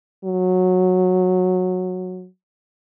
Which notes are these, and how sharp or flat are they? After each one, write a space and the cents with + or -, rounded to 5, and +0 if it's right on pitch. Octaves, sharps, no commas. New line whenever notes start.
F#3 -15